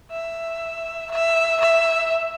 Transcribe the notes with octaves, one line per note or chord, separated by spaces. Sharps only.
E5
E5
E5